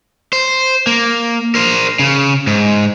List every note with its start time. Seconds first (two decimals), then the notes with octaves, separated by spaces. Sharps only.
0.33 C5
0.87 A#3
1.55 A#4 C5
1.99 C#3
2.47 G#2